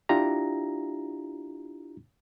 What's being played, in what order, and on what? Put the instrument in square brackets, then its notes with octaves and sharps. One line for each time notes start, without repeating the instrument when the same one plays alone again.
[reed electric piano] D4 E4 F4 G4 A#5